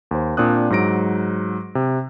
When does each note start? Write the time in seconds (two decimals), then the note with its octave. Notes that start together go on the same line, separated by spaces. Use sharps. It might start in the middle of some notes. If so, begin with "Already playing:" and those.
0.11 D#2 C5
0.37 A#2 C4 D4 D#6 F#6
0.70 G#2 F#3 A#6 D7
1.75 C3